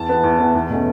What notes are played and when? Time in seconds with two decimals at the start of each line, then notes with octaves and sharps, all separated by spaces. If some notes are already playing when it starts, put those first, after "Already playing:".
Already playing: E2 A5
0.09 E3 B3
0.23 E2
0.39 E3 B3
0.55 E2
0.70 B2 A3 C#4